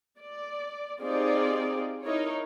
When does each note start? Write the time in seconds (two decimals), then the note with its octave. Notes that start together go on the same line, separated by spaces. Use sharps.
0.20 D5
1.02 C4 D#4 F4 G4 G#4 D5
2.04 D#4 E4 A#4 C#5